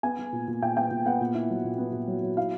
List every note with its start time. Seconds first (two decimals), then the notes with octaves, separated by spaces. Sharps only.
0.03 B3 G#5
0.19 B3
0.32 A#2
0.48 A#2
0.62 A#2 G5
0.77 B3 G5
0.91 A#2
1.06 B3 F#5
1.21 A#2
1.34 E4
1.50 F#3
1.64 A#2
1.78 B3
1.93 A#2
2.08 F#3
2.23 F#3
2.37 E4 F5